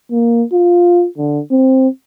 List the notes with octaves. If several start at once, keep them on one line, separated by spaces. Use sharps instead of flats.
A#3
F4
D3
C4